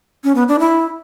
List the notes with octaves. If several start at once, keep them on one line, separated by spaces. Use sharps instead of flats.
C#4
B3
D4
E4